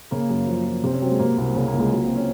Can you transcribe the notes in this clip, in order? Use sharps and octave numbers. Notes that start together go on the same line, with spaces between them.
C#3 A#3
F#2
F3
F3
C3 C4
C#4
F#3 C4
G#3
C3 A#3
C2 A#3
C#3 A#3
A#3
C#2
G#3
F#3 A#3
F#3 C4
C#4